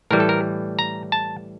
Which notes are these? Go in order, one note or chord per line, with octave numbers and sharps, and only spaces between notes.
A2 E3 G3 A#4
A4
A#4
A#5
A5